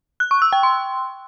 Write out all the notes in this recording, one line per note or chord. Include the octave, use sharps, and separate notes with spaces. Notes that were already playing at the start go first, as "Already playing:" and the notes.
F#6
C#6
E6
G5
C6